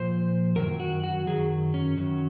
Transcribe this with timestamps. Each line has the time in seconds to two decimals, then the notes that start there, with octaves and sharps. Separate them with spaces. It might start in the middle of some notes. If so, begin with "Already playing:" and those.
Already playing: A#2 F3 C5
0.56 F#2 D#3 F#3 A#4
0.80 F#4
1.04 F#4
1.26 F#2 D#3 F#3 G#4
1.74 C#4
1.97 F#2 D#3 F#3